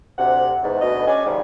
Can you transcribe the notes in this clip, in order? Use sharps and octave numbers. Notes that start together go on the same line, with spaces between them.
D2 C3 F#5
E2 G#2
D2 B2 D#5
C#4 D4 G#4 D5 G#5
G#2 C3 D#3 F3 G3